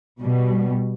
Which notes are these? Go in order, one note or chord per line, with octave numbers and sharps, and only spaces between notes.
B2 G3